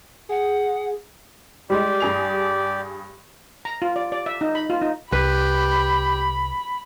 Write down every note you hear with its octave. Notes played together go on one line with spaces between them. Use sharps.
G#4 F#5
G3 G#3 G4 D5
G2 G#4 F7
A#5
F4
D5
D5
E5
D#4
B5
F4
D#4
C2 G4 B4 B5